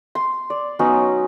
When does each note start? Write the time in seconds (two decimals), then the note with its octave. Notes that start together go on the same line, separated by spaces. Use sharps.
0.15 C6
0.50 D5
0.79 F#3 B3 C#4 D#4